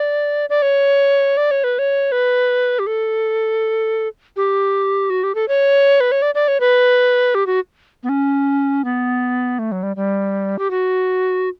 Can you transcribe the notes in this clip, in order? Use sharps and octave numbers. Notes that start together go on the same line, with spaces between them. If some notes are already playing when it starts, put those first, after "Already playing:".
Already playing: D5
D5
C#5
D5
C#5
B4
C#5
B4
G4
A4
G4
F#4
G4
A4
C#5
B4
C#5
D5
D5
C#5
B4
G4
F#4
B3
C#4
B3
A3
F#3
G3
G3
G4
F#4